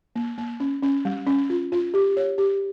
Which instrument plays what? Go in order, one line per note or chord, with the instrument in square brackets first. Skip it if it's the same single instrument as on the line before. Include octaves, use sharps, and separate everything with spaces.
[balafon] A#3
A#3
C#4
C#4
G3
C#4
F4
F4
G4
C#5
G4